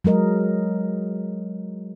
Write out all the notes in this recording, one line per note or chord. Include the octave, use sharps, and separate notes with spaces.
F#3 G#3 A#4 D#5